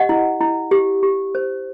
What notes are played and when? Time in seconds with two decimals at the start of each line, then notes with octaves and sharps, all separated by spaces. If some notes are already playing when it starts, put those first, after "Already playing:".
Already playing: G4 D#5 F#5
0.09 E4
0.41 E4
0.71 G4
1.03 G4
1.35 C5